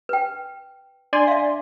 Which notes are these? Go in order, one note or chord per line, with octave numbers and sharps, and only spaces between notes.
B4 G5
D4 D5 G#5 C6
E5 F5